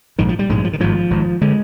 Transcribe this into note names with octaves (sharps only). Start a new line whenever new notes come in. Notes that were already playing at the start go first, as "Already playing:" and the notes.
A#1 G#2 D#3
F3
G3
A#1 G#2 G#3
F3
D#3
G#1 G#2 F3
G#1 G#2
D3 G#3